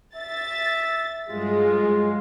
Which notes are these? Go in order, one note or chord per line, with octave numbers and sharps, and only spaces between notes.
E5 A6
G2 F#3 G#3 F4